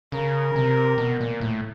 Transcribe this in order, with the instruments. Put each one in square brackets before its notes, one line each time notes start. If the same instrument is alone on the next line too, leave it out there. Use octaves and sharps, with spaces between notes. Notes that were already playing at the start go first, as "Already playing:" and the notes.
[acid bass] C#3 [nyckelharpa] A#4
[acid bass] C3
B2
A#2
A2